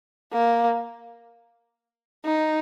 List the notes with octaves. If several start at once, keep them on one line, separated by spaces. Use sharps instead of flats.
A#3
D#4